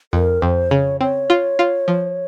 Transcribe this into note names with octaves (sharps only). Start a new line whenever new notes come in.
F2 A#4
F2 C5
C#3 C#5
C4 C#5
F4
F4
F3